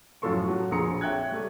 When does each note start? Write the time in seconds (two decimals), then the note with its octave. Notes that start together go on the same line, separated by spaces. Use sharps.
0.22 F#2 A2 F3 A4 C6 C#6
0.48 F#3
0.71 A#1 F2 G#4 A#5 C6 C#7
1.01 C#5 E5 G5 F#6 G#6
1.32 G3 A3